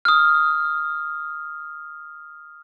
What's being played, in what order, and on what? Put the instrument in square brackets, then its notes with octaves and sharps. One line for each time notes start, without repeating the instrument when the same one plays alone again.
[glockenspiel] D#6 F6